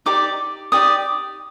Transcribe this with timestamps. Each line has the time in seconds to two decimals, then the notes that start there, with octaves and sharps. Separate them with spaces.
0.06 D#4 G4 D5 D6
0.72 D#4 G4 D5 D#6